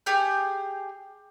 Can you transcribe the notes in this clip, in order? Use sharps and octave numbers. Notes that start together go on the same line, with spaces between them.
G4 G#4 G6